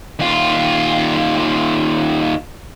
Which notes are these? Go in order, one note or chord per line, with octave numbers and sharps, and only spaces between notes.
D#2 F4